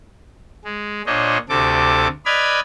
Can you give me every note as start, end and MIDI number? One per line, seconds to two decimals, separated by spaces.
0.65 1.02 56
1.06 1.38 46
1.06 1.38 62
1.06 1.38 72
1.06 1.38 73
1.06 1.38 75
1.49 2.08 38
1.49 2.08 48
1.49 2.08 69
1.49 2.08 86
2.26 2.60 71
2.26 2.60 74
2.26 2.60 75
2.26 2.60 83
2.26 2.60 89
2.26 2.60 92